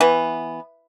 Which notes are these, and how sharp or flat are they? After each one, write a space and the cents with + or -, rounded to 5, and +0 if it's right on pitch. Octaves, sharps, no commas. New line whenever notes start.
E3 +0 B3 +0